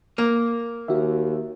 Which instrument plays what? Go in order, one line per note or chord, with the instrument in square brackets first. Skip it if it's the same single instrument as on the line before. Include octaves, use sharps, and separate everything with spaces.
[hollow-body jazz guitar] A#3
[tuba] D#2 [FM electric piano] F#4 E5